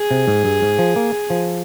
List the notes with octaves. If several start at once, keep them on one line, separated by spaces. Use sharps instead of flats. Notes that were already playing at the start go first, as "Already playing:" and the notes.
Already playing: G#4
C3
G#2
G2
G#2
F3
A#3
F3